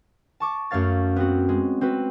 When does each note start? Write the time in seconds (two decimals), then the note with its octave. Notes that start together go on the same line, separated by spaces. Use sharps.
0.40 A5 C#6 D6
0.71 F#2 A3 C#5 F5 A6
1.16 B3 C4 F#4
1.49 G#3
1.81 C4 F#4 B4